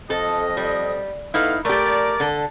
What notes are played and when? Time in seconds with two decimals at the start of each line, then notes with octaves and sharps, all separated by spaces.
0.10 F2 A4 D#5
0.57 G3
1.34 A3 B3 D#4 E4 F5
1.65 A3 G4 A#4 D5
2.20 D3 A4